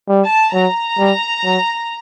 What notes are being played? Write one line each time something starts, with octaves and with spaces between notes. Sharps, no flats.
G3
A5
F#3 A#5
G3
F#3